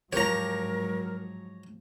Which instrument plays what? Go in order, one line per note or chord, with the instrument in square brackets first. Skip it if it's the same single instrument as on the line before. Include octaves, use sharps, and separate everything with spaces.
[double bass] G#2 F#3 [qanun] F3 G4 [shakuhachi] A#4 [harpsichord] C#5 A#5